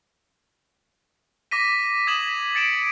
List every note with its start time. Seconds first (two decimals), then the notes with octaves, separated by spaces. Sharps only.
1.51 D6 A#6 B6 D#7
2.07 D#6 G#6 B6 E7 F#7
2.55 A6 C#7 D7 E7 F#7